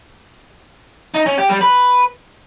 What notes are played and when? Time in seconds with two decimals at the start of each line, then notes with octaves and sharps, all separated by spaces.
1.14 D#4
1.26 C#4
1.38 G4
1.50 G3
1.61 B4